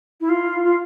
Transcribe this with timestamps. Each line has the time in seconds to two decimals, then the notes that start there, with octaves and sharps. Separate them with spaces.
0.20 E4
0.29 F4
0.64 F4